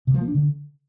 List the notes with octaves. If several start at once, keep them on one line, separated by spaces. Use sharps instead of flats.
C3
F3
A#3
D4
D3